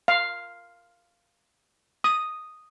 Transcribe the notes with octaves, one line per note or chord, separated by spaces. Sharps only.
F5
D#6